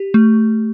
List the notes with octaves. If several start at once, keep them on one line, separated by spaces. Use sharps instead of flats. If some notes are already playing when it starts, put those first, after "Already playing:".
Already playing: G4
A3